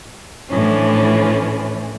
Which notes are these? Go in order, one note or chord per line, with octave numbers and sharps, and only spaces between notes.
A2 E3 F3 C#4 D4